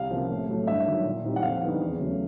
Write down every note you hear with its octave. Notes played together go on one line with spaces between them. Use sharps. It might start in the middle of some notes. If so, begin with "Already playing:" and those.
Already playing: C2 F5
C3 F3 A#3 C#4
A2
F#3 A3
G2 E5
D#3 F#3
A#2
G3 C4 D#4
F#5
F2 F5
D3 G3 B3 D#4
E2
C#3 F#3 A3